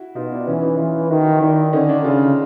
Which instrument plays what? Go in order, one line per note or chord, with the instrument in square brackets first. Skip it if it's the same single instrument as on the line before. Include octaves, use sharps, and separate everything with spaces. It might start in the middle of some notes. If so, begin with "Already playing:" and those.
Already playing: [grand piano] E4 F#4
[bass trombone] B2 [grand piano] D#4 F4
[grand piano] D4 E4
[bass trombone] E3 [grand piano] C#4 D#4
[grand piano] C#4 D#4
[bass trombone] E3 [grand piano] D#4 F4
[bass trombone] D#3 [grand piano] E4 F#4
[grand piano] D#4 F4
[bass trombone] D#3 [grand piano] D4 E4
[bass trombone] D3 [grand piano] C#4 D#4
[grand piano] D4 E4
[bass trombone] C#3 [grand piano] D#4 F4